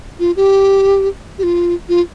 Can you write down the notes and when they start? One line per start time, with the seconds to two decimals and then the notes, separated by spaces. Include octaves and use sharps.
0.20 F4
0.36 G4
1.38 G4
1.43 F4
1.89 F4